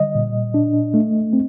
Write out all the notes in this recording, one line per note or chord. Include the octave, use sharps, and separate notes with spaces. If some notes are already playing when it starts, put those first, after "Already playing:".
Already playing: D3 G3 D#5
A#2
D4
A3
C4